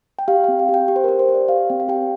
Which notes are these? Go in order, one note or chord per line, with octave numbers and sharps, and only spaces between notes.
G5
G4 F5
C4 G5
F5
G4
G5
G4
C5
G4 A#4
C5
G4
D5
G4 F5
C4 G5
F5
G4 G5